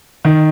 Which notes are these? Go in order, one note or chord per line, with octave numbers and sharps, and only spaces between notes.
D#3